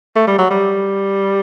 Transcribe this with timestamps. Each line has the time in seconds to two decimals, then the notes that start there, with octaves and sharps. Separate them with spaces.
0.16 A3
0.27 G3
0.38 F#3
0.50 G3